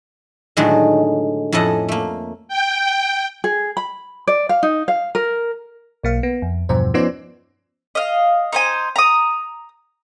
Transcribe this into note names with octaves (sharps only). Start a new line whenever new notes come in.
A2 D3 D#3 F#3 G#3 F#4
F2 A2 C#4 A4 D#5 F#5
A3 A#3
G5
G#4
B5
D5
F5
D#4
F5
A#4
B1 A#3 F5
B3
F2
E2 G2 B2 F3 C5
F3 B3 C#4 D#4 C5 D5
D#5 F5
D#4 C5 G#5
A#5 D#6